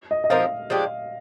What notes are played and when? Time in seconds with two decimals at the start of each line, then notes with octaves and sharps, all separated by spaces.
0.11 D#5
0.24 D#5
0.30 F3 C4 D#4 A#4 F5
0.70 F3 G#3 D4 G4